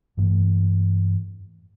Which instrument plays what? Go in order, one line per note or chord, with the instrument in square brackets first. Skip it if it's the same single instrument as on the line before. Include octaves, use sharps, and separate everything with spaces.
[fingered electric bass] G2 E3 A3